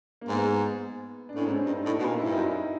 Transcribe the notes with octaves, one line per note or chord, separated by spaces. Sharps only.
A#3
G#2 B3
D4
A2 C#4
G#2 C4
D4
G2 D#4
A2 D#4
B2
A#2
E4
G2
F#2 D#4
E4